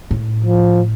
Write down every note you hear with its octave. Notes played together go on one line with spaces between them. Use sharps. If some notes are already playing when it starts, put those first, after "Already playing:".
A2
F3